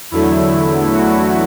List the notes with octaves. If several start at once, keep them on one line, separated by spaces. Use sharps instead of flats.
E2 D3 F#3 A3 E4
F#4